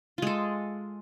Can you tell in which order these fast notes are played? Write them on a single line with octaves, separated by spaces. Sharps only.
F4 G#3 A4